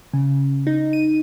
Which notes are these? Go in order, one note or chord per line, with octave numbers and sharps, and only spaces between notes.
C#3
D#4
D#7